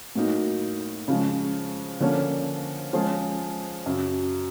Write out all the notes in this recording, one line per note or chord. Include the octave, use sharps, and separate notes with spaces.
A2 F#3 A#3 D#4
C#3 F3 G#3
D3 F3 A#3 C#4
F3 G#3 C#4 F4 G#4
F#2 C#3 F#3